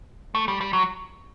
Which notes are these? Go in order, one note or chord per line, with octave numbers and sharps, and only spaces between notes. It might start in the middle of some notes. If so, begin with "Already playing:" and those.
A3
G3
G3
F#3